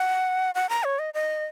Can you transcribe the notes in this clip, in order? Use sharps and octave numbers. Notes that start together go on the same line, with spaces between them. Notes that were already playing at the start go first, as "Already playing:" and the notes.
Already playing: F#5
F#5
A#5
C#5
D#5
D#5